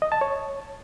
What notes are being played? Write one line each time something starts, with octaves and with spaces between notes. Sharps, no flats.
D#5
A5
C#5